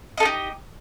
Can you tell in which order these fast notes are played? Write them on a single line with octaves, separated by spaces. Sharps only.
D#5 A4 D#4 G4